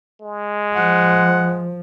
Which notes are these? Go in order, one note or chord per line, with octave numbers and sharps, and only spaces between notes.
G#3
F3 F#5